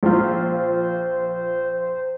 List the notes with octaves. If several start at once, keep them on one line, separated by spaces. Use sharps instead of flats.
A#1 F4 C5